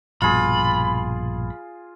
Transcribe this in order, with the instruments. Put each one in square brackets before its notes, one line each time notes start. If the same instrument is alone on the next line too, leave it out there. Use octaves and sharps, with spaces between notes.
[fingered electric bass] A#1 G2 B2 [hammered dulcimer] F4 G#4 [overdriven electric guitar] B5